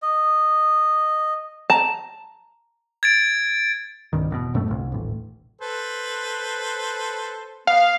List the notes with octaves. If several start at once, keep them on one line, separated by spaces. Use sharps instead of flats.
D#5
A5 A#5
G#6 A6 D7
C2 G2 D#3
E1 G#2 B2
F1 F#2 A2 A3
G1 C2
D#1 A1
A4 B4 C5
B3 F5